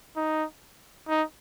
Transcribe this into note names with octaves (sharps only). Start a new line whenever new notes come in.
D#4
D#4